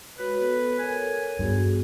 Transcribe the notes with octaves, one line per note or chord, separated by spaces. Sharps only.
G#3 F#4 B4 C#5
B3 A4
A4 A#4 C#5 G#5
G2 B3 F#4 G#4